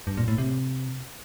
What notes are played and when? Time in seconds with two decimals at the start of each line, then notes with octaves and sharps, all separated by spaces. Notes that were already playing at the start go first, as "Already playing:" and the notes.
0.07 G2
0.17 A#2
0.28 A2
0.38 C3